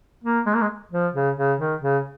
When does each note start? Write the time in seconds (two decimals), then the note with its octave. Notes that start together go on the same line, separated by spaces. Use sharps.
0.24 A#3
0.46 G#3
0.54 A#3
0.62 G#3
0.92 F3
1.14 C#3
1.38 C#3
1.59 D#3
1.82 C#3